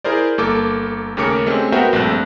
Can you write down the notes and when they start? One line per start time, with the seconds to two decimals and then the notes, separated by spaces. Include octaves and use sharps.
0.04 E4 G#4 A#4 C5 D5
0.38 G1 A#3 A4 D6
1.17 D#2 C#3 A3 A#4 D6 C#7
1.46 G#3 A3 C4 C#4 G4
1.72 B3 F#4 A#4 C5 E5 G5
1.93 A#1 G2 A3 C4 F#6